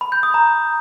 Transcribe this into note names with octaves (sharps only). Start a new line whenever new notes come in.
B5
G6
D#6
A#5